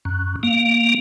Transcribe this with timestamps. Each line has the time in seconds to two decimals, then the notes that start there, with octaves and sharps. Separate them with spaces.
0.05 F#2
0.43 A#3